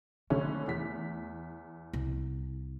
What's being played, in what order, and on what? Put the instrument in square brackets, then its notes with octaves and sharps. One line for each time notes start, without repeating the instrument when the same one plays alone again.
[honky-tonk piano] G#1 D3 C#4 [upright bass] A3
[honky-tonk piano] E2 B6
[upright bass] C2